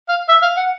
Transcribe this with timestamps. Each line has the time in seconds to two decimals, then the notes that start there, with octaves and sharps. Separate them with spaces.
0.09 F5
0.29 E5
0.42 F5
0.57 F#5